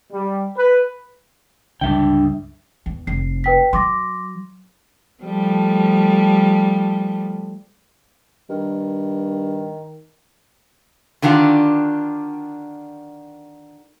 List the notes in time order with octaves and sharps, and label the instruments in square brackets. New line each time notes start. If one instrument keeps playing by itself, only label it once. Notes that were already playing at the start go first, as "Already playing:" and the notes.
[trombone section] G3
B4
[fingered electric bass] C#2 G2 D3 [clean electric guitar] D4 E5 G5
[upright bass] E2
[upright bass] F1 [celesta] C7
[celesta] B4 G5 B6
[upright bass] F#3 [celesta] C6 D6 A#6
[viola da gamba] F3 G3 A3
[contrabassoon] G2 [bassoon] D#3
[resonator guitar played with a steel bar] D3 D#3 D4 F4 G4